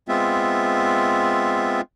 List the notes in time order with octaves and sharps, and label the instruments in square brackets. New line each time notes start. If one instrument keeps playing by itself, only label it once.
[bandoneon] G#3 B3 C4 F4 E5